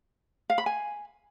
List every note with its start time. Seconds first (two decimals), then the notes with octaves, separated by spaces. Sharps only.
0.50 F5
0.58 B5
0.66 G#5